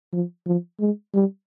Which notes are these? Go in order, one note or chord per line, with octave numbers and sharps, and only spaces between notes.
F3
F3
G#3
G3